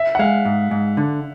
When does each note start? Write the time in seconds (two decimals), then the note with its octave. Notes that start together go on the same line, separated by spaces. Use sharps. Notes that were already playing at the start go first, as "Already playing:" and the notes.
Already playing: E5
0.15 F#5
0.19 G#3 F5
0.45 G#2
0.71 G#2
0.97 D3